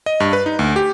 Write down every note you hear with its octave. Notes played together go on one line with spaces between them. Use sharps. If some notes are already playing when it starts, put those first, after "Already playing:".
D#5
G2
B4
D#4
D2
G4